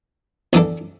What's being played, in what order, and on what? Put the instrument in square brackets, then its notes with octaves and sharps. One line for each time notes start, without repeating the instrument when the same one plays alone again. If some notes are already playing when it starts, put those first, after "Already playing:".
[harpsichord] E2 E3 D4 A4